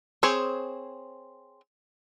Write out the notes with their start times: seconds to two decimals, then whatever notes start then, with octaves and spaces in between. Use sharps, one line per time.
0.23 C4 G#4 C5 C#5